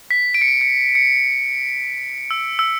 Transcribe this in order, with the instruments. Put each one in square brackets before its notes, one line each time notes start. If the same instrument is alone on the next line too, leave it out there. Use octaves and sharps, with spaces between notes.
[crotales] B6
D7
C#7
D7
C#7
C#7
E6
E6